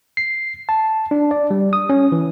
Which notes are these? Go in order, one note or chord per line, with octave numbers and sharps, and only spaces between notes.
C7
A5
D4
D5
G3
D#6
C#4
E3